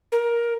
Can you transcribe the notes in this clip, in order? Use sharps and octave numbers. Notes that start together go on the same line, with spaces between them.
A#4